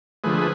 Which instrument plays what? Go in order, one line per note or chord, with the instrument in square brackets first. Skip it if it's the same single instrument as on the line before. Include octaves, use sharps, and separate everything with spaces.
[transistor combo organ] D3 F3 A3 G#4 B4